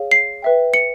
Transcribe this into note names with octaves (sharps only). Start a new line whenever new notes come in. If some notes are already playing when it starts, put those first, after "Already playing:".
Already playing: G#4 C#5 F5
C7
B4 E5 G5
C#7